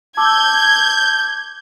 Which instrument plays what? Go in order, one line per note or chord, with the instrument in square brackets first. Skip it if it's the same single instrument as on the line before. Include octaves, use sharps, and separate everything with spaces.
[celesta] A5 D6 E6 [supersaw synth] G6 [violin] G#6